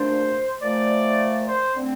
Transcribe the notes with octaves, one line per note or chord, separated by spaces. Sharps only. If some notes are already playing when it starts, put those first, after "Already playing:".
Already playing: C2 A#2 A3 D4 C5
A#2 F3 A3 D5
C5
D3 A3 C4